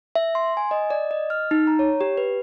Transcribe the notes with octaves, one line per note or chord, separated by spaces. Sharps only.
E5
C6
G#5
D#5
D5
D#5
F6
D#4
A#5
C#5
G4
B4